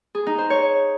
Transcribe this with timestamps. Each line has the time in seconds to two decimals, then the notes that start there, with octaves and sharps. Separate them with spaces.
0.15 G#4
0.27 D#4
0.38 C5
0.50 C#5